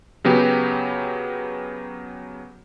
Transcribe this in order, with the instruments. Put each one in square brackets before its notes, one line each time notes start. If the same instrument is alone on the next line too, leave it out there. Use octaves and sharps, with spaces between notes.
[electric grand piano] C#3 F#3 B3 G4